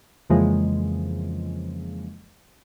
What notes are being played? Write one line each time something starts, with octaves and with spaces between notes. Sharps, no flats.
F2 C#3 E3 F3 G#3 A#3